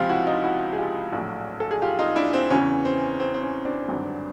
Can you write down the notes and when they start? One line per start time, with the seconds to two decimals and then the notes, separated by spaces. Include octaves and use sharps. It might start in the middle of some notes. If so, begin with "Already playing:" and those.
Already playing: C#2 C3 F3 F4 G4
0.09 E4 F#4
0.27 D#4 F4
0.44 E4 F#4
0.73 G#4
0.78 F4 G4
1.13 A#1 A2 F#3
1.60 A4
1.71 G#4
1.82 F4 G4
1.99 D#4 F4
2.16 D4 E4
2.33 C4 D4
2.50 E2 C#3 E3 C#4
2.85 C4
3.20 C4
3.34 C4
3.43 C#4
3.65 C4 D4
3.88 G#1 G2 D3 F#3